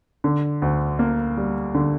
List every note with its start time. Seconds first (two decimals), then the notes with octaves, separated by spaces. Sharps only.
0.24 D3
0.62 D2
0.99 A#3
1.37 G3
1.74 D3